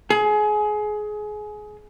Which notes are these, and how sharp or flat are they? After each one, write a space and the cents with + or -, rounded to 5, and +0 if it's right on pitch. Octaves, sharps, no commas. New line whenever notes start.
G#4 +25